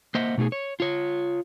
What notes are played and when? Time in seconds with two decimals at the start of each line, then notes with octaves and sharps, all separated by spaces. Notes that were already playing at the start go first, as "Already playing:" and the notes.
0.15 A#3 C5 D#5 E5 F#5
0.37 B2 A3 D#4 G4 G#4
0.52 C#5
0.80 F4 C#5